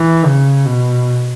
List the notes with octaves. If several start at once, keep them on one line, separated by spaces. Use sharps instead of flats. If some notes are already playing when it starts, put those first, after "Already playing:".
Already playing: E3
C#3
B2